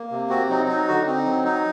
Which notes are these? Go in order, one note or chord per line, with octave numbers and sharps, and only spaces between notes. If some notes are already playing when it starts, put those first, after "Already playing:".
Already playing: A#3
C3
C4 F#4
F#3 D#4
D#4
D3 F#4
C4 D#4
F#3
D#4